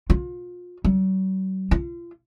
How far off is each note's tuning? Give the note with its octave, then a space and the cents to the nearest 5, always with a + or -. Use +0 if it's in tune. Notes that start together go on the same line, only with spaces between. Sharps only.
F4 +30
F#3 +45
F4 -30